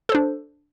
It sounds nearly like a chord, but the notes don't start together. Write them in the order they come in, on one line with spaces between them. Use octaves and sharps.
A4 C5 D4